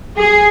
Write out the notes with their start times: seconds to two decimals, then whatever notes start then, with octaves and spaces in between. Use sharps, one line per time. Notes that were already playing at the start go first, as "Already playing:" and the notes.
0.18 G#4